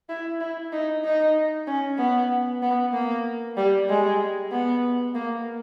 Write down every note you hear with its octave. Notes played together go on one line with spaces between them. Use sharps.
E4
E4
D#4
D#4
C#4
B3
B3
A#3
G3
G#3
B3
A#3